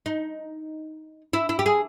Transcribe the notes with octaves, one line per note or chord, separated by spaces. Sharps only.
D#4
E4
E4
G4
G#4